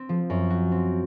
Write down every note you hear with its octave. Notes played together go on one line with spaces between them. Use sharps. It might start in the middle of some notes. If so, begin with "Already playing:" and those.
Already playing: C4
F3
F#2
F#4
C4